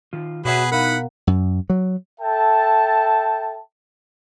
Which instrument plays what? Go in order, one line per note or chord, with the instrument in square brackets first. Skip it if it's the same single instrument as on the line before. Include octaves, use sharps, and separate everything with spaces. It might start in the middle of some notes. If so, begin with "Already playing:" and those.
[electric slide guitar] D#3 F4
[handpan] B2 F#5 [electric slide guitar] F#4 C#5 E5 [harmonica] G#4 B4
[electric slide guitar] D#4 E4 [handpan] A#4 F5 [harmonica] F#5 B5
[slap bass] F#2
F#3
[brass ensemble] A4 E5 G5 A5